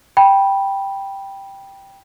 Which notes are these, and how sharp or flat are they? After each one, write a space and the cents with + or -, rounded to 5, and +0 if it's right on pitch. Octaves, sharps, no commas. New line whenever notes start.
G5 +0 B5 -15